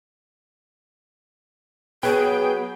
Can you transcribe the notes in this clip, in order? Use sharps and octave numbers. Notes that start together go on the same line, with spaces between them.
F#3 B3 G#4 B4 G5